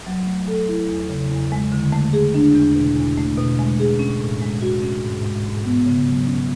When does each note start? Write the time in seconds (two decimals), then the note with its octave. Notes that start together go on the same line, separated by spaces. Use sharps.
0.06 F#3
0.27 A3
0.48 A4
0.69 E4
0.89 E2
1.10 C#3
1.31 E2
1.52 G#3
1.72 D3
1.92 A3
2.13 G#4
2.34 D4
2.56 E2
2.75 B2
2.97 E2
3.17 A3
3.38 B2
3.59 G#3
3.80 G#4
3.99 C#4
4.20 A2
4.41 G#3
4.62 F#4
4.82 C#4
5.04 G#2
5.24 G#3
5.45 G#2
5.65 B3
5.86 C#3
6.07 F#3
6.27 C#4